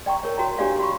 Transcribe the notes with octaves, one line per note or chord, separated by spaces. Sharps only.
D5 G5 A#5 C#6
A#4 C#5
F#4 A4 C#5 G5 A#5
D4 G4 A4 C#5 D5 F5
F#4 B5 C#6